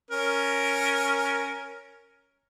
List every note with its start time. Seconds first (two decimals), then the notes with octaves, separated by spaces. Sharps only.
0.11 C#4 A#4